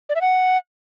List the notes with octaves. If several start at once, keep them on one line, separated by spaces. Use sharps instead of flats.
D5
E5
F#5